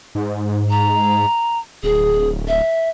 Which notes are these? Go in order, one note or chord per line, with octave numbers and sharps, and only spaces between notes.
G#2
A#5
D1 G#4
E5